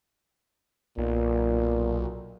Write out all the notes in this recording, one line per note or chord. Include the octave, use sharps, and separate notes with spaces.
B1 A#2